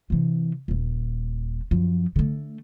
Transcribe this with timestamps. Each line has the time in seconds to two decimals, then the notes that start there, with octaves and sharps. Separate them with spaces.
0.10 C3 E3
0.68 D#1 A#2
1.71 F#2 F3
2.16 D3 A3